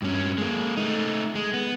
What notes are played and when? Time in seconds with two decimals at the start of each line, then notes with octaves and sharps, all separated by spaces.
0.02 G2 C#4
0.38 G#3 A#3
0.77 A3 D#4
1.35 G#3
1.53 B3